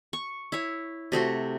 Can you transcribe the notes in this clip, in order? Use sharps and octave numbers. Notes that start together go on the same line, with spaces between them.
C#6
E4 C#5
C3 A3 F#4 C6